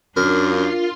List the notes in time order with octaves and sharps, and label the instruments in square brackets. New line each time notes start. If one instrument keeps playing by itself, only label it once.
[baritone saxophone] F#2 [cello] D4 [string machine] F4 C6 [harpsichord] A#4